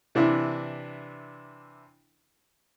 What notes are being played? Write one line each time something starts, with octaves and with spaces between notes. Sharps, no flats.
C3 E3 D4 E4